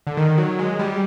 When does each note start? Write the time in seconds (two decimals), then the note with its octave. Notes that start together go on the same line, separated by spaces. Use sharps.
0.07 D3
0.17 D#3
0.38 F#3
0.59 G#3
0.79 G3